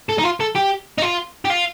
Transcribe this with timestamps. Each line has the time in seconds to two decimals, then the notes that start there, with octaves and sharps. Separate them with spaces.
0.10 A4
0.19 D#4
0.24 F4
0.41 A4
0.56 G4
0.98 D#4
1.02 F4
1.45 G4
1.50 F4